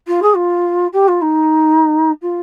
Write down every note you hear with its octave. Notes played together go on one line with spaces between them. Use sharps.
F4
G#4
F4
G4
F4
D#4
F4